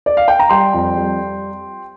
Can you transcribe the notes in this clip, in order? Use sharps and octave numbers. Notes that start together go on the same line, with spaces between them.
D5
F5
G5
A#5
G3 G5 C6
F2
G3